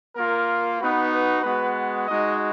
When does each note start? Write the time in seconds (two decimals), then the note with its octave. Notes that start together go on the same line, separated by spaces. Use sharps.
0.15 A#3 F4 A#4
0.79 B3 D#4 F#4 B4
1.12 B4
1.43 G#3 B3 F#4 B4
2.07 G#3 D#4 F#4 D#5